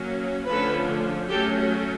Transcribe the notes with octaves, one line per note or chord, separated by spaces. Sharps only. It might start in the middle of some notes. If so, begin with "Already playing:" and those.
Already playing: F#3 A#3 C#4
D3 F3 A3 C#4 A4 B4
F#3 A3 C#4 G4 A4